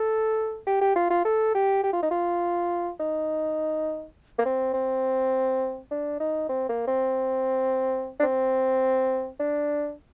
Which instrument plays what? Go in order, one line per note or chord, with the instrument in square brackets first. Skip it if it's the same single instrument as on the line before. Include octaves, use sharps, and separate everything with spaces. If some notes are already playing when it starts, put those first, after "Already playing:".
Already playing: [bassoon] A4
G4
G4
F4
F4
A4
G4
G4
F4
D#4
F4
D#4
A#3
C4
C4
D4
D#4
C4
A#3
C4
D4
C4
D4